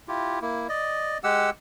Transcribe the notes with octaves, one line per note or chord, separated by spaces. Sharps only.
E4 F4 G4
A#3 E4
D5 D#5
G#3 G4 F#5 E6